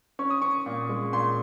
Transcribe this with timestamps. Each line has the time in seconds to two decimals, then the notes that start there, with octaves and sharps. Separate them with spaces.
0.19 C#4 C#6
0.30 D#6
0.42 C#4 C#6
0.66 A#2
0.89 G#3
1.13 A#2 C6